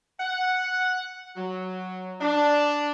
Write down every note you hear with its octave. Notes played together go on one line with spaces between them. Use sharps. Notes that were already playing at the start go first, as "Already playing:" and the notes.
F#5
F#3
D4